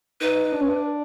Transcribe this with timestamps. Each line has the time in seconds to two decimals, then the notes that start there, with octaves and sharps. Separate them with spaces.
0.21 D#4 B4
0.44 D#4
0.52 D4
0.61 C#4
0.68 D4